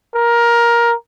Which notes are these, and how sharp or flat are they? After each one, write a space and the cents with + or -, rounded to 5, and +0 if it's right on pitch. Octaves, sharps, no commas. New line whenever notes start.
A#4 +15